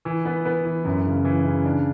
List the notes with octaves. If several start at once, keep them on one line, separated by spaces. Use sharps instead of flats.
E3
B3
B3
E3
F#2
C#3
E3
C#3
D4